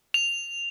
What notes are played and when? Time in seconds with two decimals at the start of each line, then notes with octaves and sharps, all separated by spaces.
0.14 F7